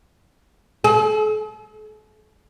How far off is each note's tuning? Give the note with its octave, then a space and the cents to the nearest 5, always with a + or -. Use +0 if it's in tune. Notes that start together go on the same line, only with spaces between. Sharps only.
A4 -45